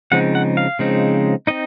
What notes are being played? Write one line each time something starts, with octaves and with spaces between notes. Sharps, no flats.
C#3 F3 G#3 C4 D#4 F#5
F#5
F5
C#3 F3 G#3 C4 D#4
C4 D#4 D#5